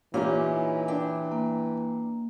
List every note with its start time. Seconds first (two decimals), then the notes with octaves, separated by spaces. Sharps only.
0.14 A#2 E3 C#4 D#4 E4 G4
0.88 D4 G5
1.32 A#3